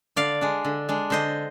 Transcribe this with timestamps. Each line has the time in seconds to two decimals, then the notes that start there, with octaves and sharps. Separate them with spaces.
0.16 D3 D5 F5
0.41 G#3 D4
0.65 D3
0.89 G#3 D4
1.10 D3 C5 D#5